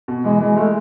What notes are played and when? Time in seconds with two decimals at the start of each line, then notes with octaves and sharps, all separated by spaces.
0.08 B2
0.24 E3 G#3
0.40 E3 G#3
0.56 G#3 A3